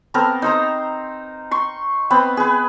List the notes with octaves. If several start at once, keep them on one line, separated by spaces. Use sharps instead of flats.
B3 C4 A4 A#4
D#4 C5 A#5
C6 C#6
B3 C4 B4
G#4 B4